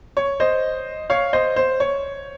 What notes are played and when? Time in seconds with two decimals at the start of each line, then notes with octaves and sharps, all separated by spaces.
0.17 C#5
0.40 C5 D#5
1.10 C#5 F5
1.33 C5 D#5
1.56 C5
1.80 C#5